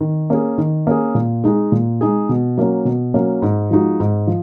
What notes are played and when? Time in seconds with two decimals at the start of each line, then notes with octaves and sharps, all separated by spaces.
0.01 D#3
0.30 A#3 C#4 G#4
0.58 D#3
0.87 A#3 C#4 G#4
1.15 A#2
1.44 G#3 D#4 G#4
1.72 A#2
2.01 G#3 D#4 G#4
2.29 B2
2.58 F#3 A#3 C#4
2.85 B2
3.14 F#3 A#3 C#4
3.42 G#2
3.71 F3 G#3 D#4 F#4
4.00 G#2
4.27 F3